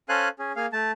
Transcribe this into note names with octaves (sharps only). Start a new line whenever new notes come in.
C#4 A4 C5 F5 G#5 F#6
C#4 G#4
A#3 G#4 F5
A3 A5